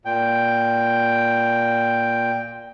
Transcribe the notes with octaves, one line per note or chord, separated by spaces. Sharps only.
A#2 G5